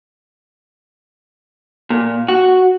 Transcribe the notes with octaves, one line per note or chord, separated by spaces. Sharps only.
A#2
F#4